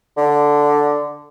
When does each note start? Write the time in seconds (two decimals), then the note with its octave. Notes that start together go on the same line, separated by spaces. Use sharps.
0.17 D3